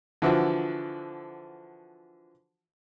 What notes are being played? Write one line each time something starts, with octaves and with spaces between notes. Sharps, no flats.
D3 E3 F3 F#4